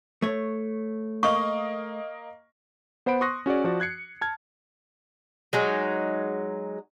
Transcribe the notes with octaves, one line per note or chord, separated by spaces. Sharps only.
A3 C#5
A#3 D#5 C#6
B3 C5 F#5 B5 D7
C6 C#6 D#6 F#6 A#6
C#4 F#4 G#4 D5
F3 F#4 D5
F#6 G#6 C7 C#7
A5 F6 G#6
F#3 G#3 D#4